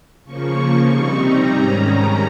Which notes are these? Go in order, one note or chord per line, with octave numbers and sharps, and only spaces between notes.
C#3 F3 A#3 C#6
C3 G3 C4 D#4 C#6
A#5
G#2 D#3 G3 C#4
A#5